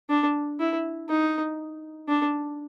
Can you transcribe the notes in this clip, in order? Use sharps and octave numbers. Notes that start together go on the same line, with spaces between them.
D4
E4
D#4
D4